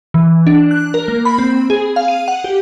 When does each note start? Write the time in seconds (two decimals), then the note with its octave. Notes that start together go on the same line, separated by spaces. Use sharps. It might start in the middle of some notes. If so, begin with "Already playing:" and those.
0.14 E3
0.47 D4
0.71 F#6
0.94 A#4
1.08 A#3
1.25 B5
1.38 C4
1.70 G#4
1.96 F5
2.08 D#7
2.28 F#5
2.44 G4